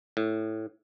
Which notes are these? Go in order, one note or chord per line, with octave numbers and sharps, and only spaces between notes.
A2